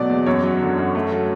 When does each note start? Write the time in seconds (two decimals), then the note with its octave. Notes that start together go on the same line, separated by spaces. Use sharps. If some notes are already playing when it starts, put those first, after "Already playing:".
Already playing: B2 F#3 A3 D5
0.10 E2
0.26 F#2 C#5
0.43 F#3
0.61 D3
0.78 F#2
0.95 A3
1.12 F#3